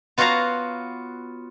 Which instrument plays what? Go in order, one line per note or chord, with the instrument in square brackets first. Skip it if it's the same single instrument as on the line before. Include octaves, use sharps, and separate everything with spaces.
[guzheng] B3 F4 F#4 C#5 F5 A#5